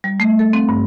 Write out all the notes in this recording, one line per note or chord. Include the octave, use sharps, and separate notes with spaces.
G3
A3
A4
C4
G2